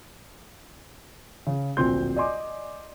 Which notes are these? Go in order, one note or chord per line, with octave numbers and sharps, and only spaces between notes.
C#3
D1 A#1 C4 C6 G6
D5 D#5 G#5 C6 D6